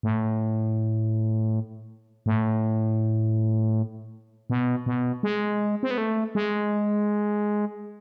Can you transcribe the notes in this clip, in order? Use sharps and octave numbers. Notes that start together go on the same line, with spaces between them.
A2
A2
B2
B2
G#3
C4
B3
A3
G#3